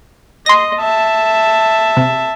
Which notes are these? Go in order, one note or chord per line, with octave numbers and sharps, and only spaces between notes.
D#5 C6 A#6
E5 A5
C3